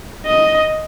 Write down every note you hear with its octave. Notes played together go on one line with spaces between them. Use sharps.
D#5